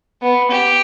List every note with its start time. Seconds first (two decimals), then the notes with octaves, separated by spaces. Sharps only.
0.22 B3
0.51 G4